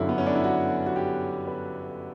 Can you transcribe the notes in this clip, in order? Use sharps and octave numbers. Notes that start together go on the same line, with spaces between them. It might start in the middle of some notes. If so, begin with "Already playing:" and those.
Already playing: G1 F#2 D3 F#3 E4
B3
C#4
D4
E4
F#4
F#4
G4
B4